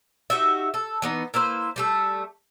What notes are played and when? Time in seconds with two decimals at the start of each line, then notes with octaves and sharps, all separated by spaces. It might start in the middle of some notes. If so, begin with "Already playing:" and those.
0.30 D#4 F#4 G4 E5
0.74 A4
1.02 E3 B3 D#4
1.34 A#3 E4 B4 C5
1.76 G3 A3 A4